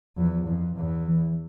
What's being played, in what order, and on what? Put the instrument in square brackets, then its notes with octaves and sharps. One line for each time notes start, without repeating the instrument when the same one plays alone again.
[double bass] E2 [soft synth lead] F3
[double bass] F2 [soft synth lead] E3
[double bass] E2
[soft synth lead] E3